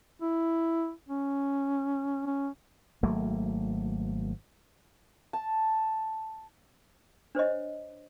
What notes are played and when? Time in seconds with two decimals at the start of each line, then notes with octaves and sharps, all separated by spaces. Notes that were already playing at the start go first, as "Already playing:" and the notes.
0.22 E4
1.09 C#4
2.26 C#4
3.03 G#1 F#3 A3 A#3
5.33 A5
7.35 D4 C5 C#5 D#5